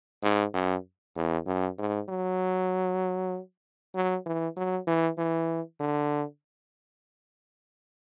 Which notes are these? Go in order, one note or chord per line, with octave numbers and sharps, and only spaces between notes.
G#2
F#2
E2
F#2
G#2
F#3
F#3
E3
F#3
E3
E3
D3